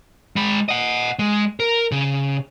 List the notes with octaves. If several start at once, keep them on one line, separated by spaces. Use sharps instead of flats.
G#3 B5
D#5 F#5
G#3
A#4
C#3